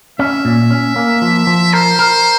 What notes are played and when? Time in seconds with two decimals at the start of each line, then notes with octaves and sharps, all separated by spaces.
0.19 C#4 E5
0.45 A#2
0.71 C#4
0.96 A#3
1.22 F3
1.47 F3
1.73 A#4 C5
1.99 A#4